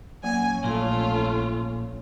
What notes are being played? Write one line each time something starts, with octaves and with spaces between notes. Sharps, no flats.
A#1 F#3 A#3 C#4 G#5
A#2 A3 F4